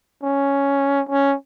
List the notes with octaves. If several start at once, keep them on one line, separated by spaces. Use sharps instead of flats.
C#4
C#4